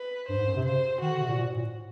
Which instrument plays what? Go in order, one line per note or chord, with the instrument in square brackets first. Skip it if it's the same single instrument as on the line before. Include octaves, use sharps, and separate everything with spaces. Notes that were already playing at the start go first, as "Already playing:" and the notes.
Already playing: [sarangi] B4
[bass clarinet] G2 [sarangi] C5
[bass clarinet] G#2
F#2
C3
[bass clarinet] C#3 [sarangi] C5
[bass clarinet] D#3 [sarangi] F#4
[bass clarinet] D3
C3
A#2
A#2
A2
A#2
A2